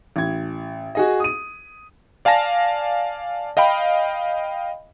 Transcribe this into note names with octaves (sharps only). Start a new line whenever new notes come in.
A1 G#6
F#4 G#4 D#5
D#6 D#7
D5 F5 G#5 A5 A#6
D#5 F5 G5 B5